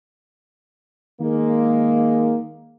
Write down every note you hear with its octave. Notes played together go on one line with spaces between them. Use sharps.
D#3 G#3 A#3